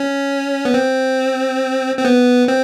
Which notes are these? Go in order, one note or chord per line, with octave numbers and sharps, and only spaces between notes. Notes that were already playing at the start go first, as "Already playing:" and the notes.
Already playing: C#4
B3
C4
C4
B3
C4